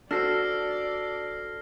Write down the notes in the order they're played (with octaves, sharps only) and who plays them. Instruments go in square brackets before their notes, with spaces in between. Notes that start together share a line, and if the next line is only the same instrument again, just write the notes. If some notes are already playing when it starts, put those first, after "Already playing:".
[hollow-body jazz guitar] D4 F#4 C5 [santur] A4 [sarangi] D5 [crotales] F6 A#6 C7